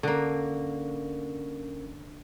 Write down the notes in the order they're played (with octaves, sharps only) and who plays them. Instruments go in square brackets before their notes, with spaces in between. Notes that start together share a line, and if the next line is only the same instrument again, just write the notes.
[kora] D3 A#3 [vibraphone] C#4 A#4